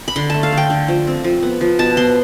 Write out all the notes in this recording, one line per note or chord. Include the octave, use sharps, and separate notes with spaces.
B5
D3 C6
A3 A5
F5
D3
G5
D3
F3
C4
F3
B3
F3
B2 A5
B3 C6